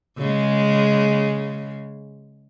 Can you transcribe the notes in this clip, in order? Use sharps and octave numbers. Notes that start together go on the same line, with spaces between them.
C#3 G#3